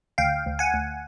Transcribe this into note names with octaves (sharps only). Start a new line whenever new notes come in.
D2 F5 G5
D2
F#5 G#5
D2